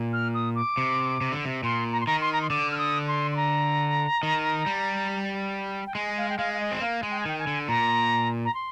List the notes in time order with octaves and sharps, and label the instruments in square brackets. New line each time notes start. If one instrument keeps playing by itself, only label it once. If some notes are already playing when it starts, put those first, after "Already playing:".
Already playing: [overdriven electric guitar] A#2
[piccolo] F6
D#6
D6
[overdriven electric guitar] C3
C3
D3
C3
[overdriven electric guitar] A#2 [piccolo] C6
[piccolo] A#5
C6
[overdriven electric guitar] D#3 [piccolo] A#5
[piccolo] C6
A#5
C6
[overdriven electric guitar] D3 [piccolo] D6
[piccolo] F6
D#6
C6
C6
A#5
[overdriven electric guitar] D#3
G3
[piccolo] G5
[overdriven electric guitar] G#3 [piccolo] G#5
[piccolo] F5
G5
[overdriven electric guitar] G#3 [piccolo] F5
[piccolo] F5
D#5
[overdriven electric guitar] C4
[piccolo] D#5
[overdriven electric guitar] A#3 [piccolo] F5
[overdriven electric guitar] G#3
[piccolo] G5
G#5
[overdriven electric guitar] D#3 [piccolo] G5
[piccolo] G#5
[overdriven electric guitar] D3
[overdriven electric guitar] A#2 [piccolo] A#5
[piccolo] A#5
C6